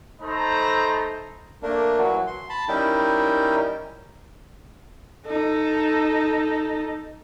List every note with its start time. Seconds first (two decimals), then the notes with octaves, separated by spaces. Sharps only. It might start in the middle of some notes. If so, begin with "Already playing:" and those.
0.22 A3 D#4 A4 C5 A#5 B5
1.63 A3 A#3 D4 A#4
1.98 E3 F#3 F#4
2.27 C6
2.49 A5 B5
2.69 G3 C#4 D#4 E4 A#4 G5
5.26 D#4 A4